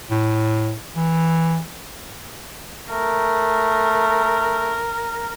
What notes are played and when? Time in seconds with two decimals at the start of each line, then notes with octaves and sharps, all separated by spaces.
0.10 A2
0.96 E3
2.90 A3 A#4